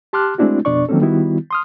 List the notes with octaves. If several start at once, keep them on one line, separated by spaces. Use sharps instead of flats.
G4 A5 C6 D6 F6 F#6
G#3 A3 C4 D4 E4 F#4
F2 B2 D4 D5 C#6
D#3 F#3 A#3 C4 C#4 A4
D#3 G3 B3 E4 F#4
C6 D#6 F6